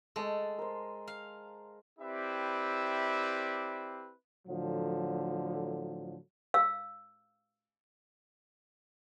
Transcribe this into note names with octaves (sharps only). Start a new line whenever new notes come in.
G#3 A3 A5 E6
A#4 C5
F5
C4 E4 G4 B4 D5 E5
A2 D3 F3 F#3
F5 E6